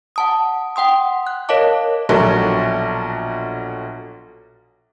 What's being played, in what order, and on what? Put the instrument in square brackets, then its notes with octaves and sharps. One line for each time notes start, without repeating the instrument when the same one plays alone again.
[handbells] F#5 A5 D#6
F#5 G5 C6 D#6
F#6
A#4 C#5 D#5 F5 A5 D6
[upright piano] A#1 B2 F#3 A4